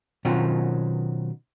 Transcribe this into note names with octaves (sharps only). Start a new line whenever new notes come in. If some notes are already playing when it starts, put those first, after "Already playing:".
B2 D#3 F#3 C4 C#4 F4